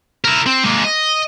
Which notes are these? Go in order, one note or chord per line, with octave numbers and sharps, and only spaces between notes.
E4 A#4
C4
G#3 A#3
D#5